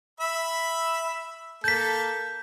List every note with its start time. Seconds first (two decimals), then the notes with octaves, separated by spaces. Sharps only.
0.20 E5 B5 E6
1.64 A#3 A4 G6 B6